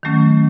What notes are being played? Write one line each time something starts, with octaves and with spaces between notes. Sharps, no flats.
D#3 F#3 A3 C#4